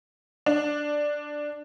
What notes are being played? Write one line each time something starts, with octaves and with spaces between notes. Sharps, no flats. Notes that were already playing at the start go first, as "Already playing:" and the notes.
D4